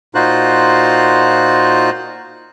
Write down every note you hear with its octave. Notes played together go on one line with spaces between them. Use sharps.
A#2 D#4 F4 F#4 C5 F#6